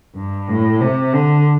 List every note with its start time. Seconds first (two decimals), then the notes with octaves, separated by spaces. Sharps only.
0.16 G2
0.49 A2
0.81 C3
1.14 D3